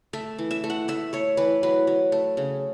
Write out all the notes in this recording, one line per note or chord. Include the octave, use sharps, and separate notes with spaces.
A3 E5
E3
E5
A3
F#5
A3 E5
A3 C#5
E3 B4
F#3 B4
F#3
A3
C#3